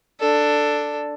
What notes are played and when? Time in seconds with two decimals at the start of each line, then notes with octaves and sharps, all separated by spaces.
0.20 D4 A4